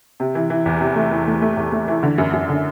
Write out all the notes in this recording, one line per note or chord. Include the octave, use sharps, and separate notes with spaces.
C3
E3
E3
E2
C3
A3
E3
A3
A3
E2
A3
E3
D3
F#2
F#2
D3